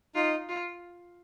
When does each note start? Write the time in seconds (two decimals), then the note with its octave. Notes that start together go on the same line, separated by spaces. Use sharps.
0.15 D#4 F4
0.49 F4